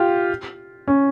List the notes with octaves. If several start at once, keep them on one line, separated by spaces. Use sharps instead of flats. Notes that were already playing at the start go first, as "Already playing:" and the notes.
Already playing: F4 G4
C#4